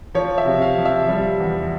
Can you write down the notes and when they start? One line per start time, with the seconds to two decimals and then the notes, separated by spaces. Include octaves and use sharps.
0.14 F3 C#5
0.38 E5
0.46 C3
0.62 F5
0.78 F3
0.85 E5
1.09 G3
1.40 E2